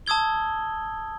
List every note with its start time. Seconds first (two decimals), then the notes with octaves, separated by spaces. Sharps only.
0.06 A5 D#6 E6 G#6 G7